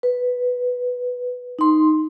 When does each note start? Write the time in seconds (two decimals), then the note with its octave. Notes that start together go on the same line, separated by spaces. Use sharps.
0.03 B4
1.59 D#4 C6